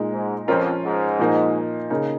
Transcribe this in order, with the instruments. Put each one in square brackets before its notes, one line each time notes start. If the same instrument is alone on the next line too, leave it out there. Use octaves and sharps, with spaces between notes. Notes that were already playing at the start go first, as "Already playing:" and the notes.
Already playing: [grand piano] A#2 G#3 D#4
[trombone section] G#2
[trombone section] F2 [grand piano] F3 C#4 F4 A#4
[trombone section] G#2
[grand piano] A#2 F3 A#3 D#4
C#3 A#3 D#4